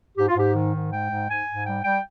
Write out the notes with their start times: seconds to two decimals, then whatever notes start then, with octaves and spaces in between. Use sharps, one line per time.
0.17 G#2 G4
0.28 F4
0.36 G#2 G4
0.54 D#3
0.74 G#2
0.92 G#3 G5
1.10 G#2
1.29 G#2 G#5
1.47 G#2
1.65 G3 G5
1.84 G3 G5